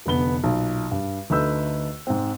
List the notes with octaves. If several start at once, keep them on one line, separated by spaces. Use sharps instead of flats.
F1 D3 B3 G7
B1 A#2
G2
D2 A3 D#4 B4 E6 G6
G#2 C4